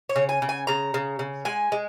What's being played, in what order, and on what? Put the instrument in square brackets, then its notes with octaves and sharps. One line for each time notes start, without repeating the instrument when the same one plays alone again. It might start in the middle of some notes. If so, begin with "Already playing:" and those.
[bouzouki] C#5
C#3
G#5
C#3
G#5
C#3 A#5
C#3
C#3
G#3 G#5
G#3